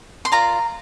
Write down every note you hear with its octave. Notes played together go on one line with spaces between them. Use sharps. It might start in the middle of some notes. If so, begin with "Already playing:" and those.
C6
F4 A#4 D5 A#5